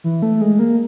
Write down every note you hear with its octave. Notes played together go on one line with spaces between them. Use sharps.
E3
A3
G#3
A#3